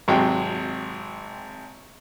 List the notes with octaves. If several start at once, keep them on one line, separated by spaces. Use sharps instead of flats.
G#1 C3 F#3 G#3 G5